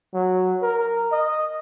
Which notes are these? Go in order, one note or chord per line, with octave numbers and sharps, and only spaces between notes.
F#3
A#4
D#5